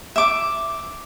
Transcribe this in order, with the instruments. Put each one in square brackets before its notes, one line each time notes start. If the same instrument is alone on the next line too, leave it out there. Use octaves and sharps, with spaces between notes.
[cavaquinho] E5 D6